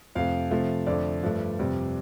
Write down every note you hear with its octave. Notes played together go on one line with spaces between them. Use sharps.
F2 C3 A3 F5
C3 F3 A3
F2 D3 A3 D5
G2 F3 A3
F2 C3 G3